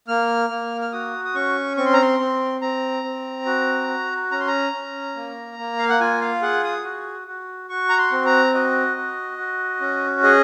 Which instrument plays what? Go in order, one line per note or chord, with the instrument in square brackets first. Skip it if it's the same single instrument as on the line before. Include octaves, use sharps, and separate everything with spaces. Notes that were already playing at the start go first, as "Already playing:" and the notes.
[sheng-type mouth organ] A#3 F6
A#3
F6
F#4 D#6
D#6
C#4 C#6
C4 C#6
C6
A#5
C6
C4
C4 A#5
C4
F#4
F#4
C#4 A#5
C6
A#5
C#4
A#3
A#3
F5
F#5
F4 G#5
F5
G#4 F#5
D#6
F#4
F#4
F#4 C#6
A#5
C6
C4
A#5
F#4 D#5
F#4
F#4
C#4
G#4 D#5